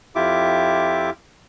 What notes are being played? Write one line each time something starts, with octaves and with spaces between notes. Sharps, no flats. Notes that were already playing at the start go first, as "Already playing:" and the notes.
F2 E4 F4 G4 E5 D6